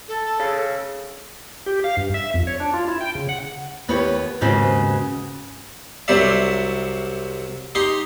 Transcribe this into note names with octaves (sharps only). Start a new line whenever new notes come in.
A4
C#3
G4
F5
G2
E5
F2
C#5
D4
F4
E4
G5
C#3
F#5
D#2 B3 E4 G4 C#5
D#2 G#2 C#3 B3 C4 F#4
C2 C3 F#3 C5 D5 E5
D#4 G4 C6